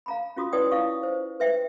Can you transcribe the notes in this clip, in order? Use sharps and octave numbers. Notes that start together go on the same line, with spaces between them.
F5 A#5 B5
C#4 F4 F#4 D#6
E4 B4 C#5 D5 G5 D#6
D#4 E4 B4 F5 C#6 D#6
C5
B4 E5 G5